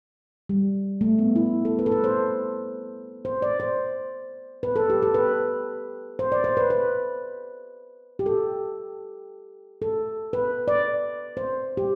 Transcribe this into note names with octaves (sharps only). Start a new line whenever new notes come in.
G3
A3
B3
E4
A4
B4
A4
B4
C5
C5
D5
C5
B4
A4
G4
A4
B4
C5
D5
C5
B4
B4
G4
A4
A4
B4
D5
C5
G4